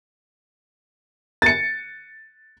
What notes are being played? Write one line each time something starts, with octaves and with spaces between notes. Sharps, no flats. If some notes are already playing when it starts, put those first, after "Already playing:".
A6 C#7